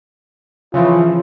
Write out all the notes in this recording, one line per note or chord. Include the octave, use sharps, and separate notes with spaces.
C#3 E3 F3 F4